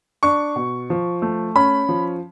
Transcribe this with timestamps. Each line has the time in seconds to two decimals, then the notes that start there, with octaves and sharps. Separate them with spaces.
0.23 D4 C#6
0.56 B2
0.90 F3
1.22 A3
1.56 C#4 B5
1.89 F3